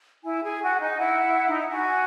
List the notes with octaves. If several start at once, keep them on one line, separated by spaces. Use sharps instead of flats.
E4 G#5
G#4
G#5
F#4
F#5
G#5
D#4
E4 F#5
D#4
E4
F#4 G#5